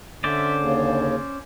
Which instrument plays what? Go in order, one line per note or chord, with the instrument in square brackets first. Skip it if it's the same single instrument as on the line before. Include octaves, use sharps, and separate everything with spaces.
[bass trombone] D3 [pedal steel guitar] C#4 C5 D5 [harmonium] E5
[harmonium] D#2 C#3